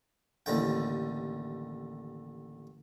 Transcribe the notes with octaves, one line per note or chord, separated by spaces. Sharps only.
A1 D#2 D3 G5